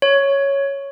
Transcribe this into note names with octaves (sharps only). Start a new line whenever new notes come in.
C#5